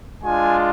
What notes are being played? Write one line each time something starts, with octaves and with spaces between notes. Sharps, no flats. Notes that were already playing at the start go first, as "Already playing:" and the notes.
G#3 D4 F4 G#5